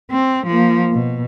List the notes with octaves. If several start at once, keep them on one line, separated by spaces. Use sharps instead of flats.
C4
F3 A#3
B2